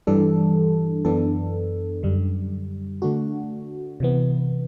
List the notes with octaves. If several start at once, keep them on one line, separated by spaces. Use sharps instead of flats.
G2 E3 G3 D4 A4
F#2 E3 B3 D4 A4
F#2 D3 G3
D3 A3 D4 F#4
C3 E3 B3